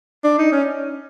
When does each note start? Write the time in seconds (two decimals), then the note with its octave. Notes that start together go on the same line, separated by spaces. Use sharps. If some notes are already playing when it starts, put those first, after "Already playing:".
0.24 D4
0.38 D#4
0.52 C#4